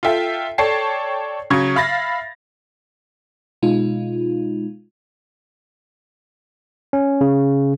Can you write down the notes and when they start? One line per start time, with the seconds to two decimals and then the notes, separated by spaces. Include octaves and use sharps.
0.03 F4 A4 E5 G5
0.58 A4 C#5 D5 G5 A5 C7
1.50 C#3 F#3 C#6 G#6
1.76 E5 F5 B5 A6 A#6
3.62 B2 G#3 D#4 F4
6.93 C#4
7.21 C#3